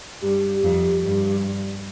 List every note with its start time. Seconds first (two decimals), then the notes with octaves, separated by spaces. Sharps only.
0.22 G2 G4
0.63 F2
1.03 G2